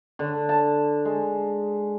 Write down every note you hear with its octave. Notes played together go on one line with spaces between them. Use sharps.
D3
A5
G#3